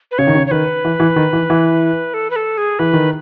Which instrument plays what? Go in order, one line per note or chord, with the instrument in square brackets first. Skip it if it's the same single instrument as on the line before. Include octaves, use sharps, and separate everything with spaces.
[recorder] B4
[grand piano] C#3 [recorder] C#5
[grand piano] D#3
C#3
[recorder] C#5
[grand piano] D#3 [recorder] B4
[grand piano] E3
E3
D#3
E3
E3
[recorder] A4
B4
A4
G#4
[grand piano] E3 [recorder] B4
[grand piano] D#3